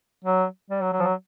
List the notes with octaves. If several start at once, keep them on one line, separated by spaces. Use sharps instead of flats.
F#3
G3
F#3
F#3
F3
F#3